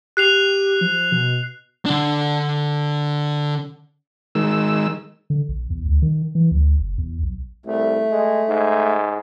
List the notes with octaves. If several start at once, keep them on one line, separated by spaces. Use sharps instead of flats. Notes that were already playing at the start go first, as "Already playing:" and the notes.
G4 F#6 C7 F7
F3
B2
D3 D4
D#3 G#3 E6
D3
A#1
E2
D2
D#3
E3
D2
F#1
E2
B1
C2 A3
G#3
G#2